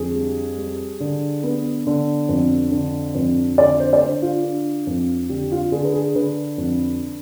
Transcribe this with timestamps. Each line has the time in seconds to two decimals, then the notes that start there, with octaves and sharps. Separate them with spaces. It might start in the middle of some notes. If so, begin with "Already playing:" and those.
Already playing: F2 D3 G#4
0.15 G3
0.57 G3
1.00 D3
1.43 B3
1.87 D3
2.29 F2
2.72 D3
3.15 F2
3.58 D3 D5
3.80 C5
3.93 D5
4.01 D3 C5
4.22 F4
4.43 D4
4.87 F2
5.30 D3 G4
5.52 F4
5.72 D3 G#4
5.85 B4
5.94 G#4
6.15 D3 B4
6.58 F2